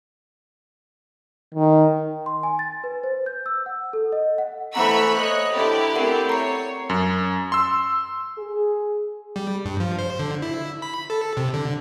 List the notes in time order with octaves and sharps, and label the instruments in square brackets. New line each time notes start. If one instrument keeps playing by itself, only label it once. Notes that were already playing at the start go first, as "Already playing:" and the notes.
[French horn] D#3
[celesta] C6
G#5
A6
B4
C5
G6
E6
F#5
A4
D#5
F#5
[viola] E3 A3 [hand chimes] C5 F#5 A#5 [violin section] B5 C#6 E6
[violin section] C#5 F#6 [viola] D#5
[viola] D3 [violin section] E4 G4 D5
[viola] A3 C4 [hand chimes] A#4 F#5
[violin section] C#5 [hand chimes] A#5 C7
[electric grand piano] F#2
C6 E6
[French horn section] G#4
[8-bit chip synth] G3
G2
F3
C5
D3
E4
B5
A4
C3
D3